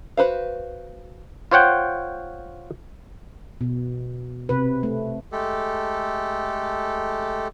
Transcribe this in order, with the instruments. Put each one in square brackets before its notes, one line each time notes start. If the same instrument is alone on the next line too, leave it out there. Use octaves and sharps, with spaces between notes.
[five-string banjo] F#4 B4 C5 F5
[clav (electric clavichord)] F4 C5 C#5 F#5 G5
[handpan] B2
C3 B4
A3
[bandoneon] G#3 A3 G4 A4